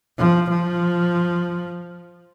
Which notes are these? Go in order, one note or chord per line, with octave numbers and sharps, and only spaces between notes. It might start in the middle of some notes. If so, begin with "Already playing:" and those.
F3
F3